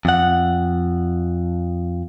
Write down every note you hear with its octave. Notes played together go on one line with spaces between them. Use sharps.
F2 F#5